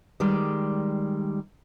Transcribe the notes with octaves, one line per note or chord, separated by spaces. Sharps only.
D#3 G3 G#3 D5